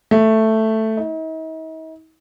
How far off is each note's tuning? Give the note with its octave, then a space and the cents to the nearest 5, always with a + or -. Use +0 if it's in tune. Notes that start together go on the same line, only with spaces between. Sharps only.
A3 +5
D#4 +45